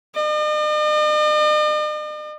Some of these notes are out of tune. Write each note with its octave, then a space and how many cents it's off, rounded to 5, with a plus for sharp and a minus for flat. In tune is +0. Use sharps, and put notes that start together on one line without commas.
D#5 -45